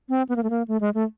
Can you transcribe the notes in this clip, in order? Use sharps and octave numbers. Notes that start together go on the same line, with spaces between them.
C4
B3
A#3
A3
A#3
A3
G#3
A3